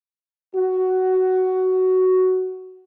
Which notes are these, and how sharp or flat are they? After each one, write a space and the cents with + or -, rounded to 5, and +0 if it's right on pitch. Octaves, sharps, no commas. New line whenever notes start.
F#4 +10